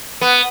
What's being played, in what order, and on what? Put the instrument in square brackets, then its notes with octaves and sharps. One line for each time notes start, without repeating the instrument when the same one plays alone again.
[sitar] B3